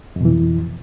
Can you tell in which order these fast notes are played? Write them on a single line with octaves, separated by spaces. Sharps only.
F2 B2 E3